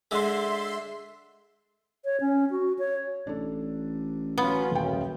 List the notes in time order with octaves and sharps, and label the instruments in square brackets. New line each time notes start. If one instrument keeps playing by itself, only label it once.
[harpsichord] D3 G#3 [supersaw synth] E5 C6
[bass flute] C#5
C#4
F#4
C#5
[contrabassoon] A1 [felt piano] D4 A4
[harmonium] F#3 C#4 F4 [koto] B3
[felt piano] D#1 F#3 G5 [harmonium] F#2 C#3